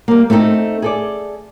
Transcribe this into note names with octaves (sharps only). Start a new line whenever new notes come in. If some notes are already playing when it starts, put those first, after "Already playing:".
G3 A#3
A3 C4 D#4 G4 A4
G#4 A4 D5